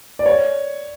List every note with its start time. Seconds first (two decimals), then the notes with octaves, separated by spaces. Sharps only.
0.19 D5
0.26 C#5